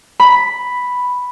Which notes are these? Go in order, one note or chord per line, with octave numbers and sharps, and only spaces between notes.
B5